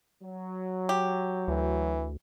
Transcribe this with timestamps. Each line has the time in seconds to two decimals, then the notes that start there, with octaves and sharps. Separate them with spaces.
0.21 F#3
0.89 G4
1.48 D2 E3